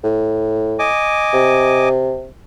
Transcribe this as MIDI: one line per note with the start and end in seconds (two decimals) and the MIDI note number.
0.04 0.89 45
0.79 1.89 75
0.79 1.89 80
0.79 1.89 86
1.33 2.29 48